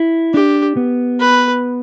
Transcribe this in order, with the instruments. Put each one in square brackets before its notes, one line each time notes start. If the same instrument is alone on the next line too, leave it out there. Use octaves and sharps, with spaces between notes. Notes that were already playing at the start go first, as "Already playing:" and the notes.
Already playing: [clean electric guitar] E4
[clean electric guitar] D4 [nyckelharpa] G4
[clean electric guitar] B3
[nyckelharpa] B4